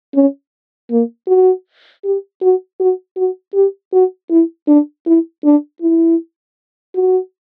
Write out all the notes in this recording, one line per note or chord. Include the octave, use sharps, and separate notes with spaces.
C#4
A#3
F#4
G4
F#4
F#4
F#4
G4
F#4
E4
D4
E4
D4
E4
F#4